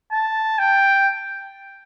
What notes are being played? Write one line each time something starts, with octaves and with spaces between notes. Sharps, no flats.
A5
G5